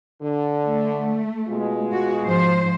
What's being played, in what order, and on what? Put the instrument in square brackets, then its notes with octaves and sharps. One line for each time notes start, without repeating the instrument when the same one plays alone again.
[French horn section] D3
[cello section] A3
[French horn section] B2 G#3 F4
[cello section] F#4
G#2 F3 C5